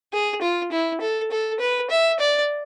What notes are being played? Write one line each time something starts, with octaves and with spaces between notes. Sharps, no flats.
G#4
F4
E4
A4
A4
B4
E5
D5